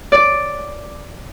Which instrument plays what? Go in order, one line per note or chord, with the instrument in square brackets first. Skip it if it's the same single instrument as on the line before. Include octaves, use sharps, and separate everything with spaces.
[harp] D5